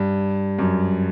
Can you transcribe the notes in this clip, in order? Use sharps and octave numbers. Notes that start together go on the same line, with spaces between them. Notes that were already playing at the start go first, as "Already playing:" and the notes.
Already playing: G2
F#2